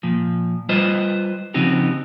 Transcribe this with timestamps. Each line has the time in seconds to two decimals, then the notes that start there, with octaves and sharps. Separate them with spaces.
0.03 A#2 F3
0.69 G3 F4 B4 C5 D#5
1.54 C#3 F3 C4 D#4 F#4 G4